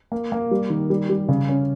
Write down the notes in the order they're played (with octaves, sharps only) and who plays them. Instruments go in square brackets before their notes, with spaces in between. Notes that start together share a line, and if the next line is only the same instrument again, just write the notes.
[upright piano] A#3
A#3
G3
D#3
G3
G3
C#3
C#4